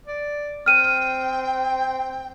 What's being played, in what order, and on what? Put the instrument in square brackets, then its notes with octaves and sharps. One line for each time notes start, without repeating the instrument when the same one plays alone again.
[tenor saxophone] D5
[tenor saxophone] C4 [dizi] G5 [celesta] F6 D#7